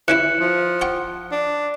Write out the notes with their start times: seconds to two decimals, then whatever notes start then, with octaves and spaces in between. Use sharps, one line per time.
0.08 E3 C#4 E4 F#6 C#7
0.40 F3
0.81 F#5 G5 C#6
1.32 D4